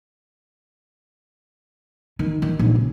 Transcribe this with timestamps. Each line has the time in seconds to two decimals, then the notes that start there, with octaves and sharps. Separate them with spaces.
2.19 D#3
2.42 D#3
2.59 A#1
2.75 C#3